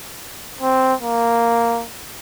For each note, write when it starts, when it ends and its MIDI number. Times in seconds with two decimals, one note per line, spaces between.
0.61 0.94 60
1.01 1.84 58